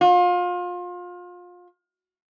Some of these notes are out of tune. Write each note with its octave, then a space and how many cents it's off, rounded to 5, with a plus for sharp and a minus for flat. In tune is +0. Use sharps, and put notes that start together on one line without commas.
F4 +30